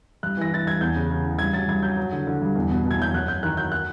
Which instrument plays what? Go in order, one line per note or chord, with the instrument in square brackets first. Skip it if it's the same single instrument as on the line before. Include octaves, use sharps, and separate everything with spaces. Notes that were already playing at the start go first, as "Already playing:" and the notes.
[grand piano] G2 F#6
E3 A#6
E3 A6
G2 G#6
E2 G6
C#3
C#3
C#3
G2 G#6
F#3 A6
G2 G#6
F#3 G6
F#3
D3
D3
G2
E2
B2
B2
G#6
F#3 G6
F#2 F#6
F#2 G6
D#3 F#6
F#3 G6
F#6